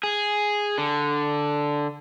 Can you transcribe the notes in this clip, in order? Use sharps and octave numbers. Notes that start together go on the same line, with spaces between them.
G#4
D3